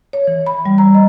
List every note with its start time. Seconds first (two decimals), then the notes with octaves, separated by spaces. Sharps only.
0.13 C#5
0.27 E3
0.47 B5
0.66 G3
0.78 A#5
0.95 D#5